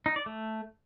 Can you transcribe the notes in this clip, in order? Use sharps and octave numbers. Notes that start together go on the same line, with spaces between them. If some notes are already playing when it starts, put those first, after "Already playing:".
D#4
D5
A3